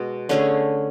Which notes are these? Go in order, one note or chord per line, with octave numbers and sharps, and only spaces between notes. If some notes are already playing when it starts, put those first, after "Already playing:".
Already playing: B2 G#3
D3 A3 C#4 G#4